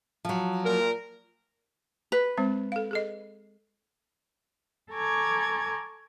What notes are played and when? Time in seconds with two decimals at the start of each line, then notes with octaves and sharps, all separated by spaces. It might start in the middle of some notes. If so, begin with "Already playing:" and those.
0.25 F3 F#3
0.65 A#2 A#4
2.12 B4
2.37 G#3 C4 C5
2.72 A4 F5
2.91 G#4 A4 D#5
4.91 A4 G#5 A#5 C#6 D6 G#6